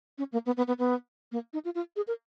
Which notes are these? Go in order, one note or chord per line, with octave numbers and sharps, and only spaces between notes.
C#4
A#3
B3
B3
B3
B3
A#3
D#4
F4
F4
G#4
A#4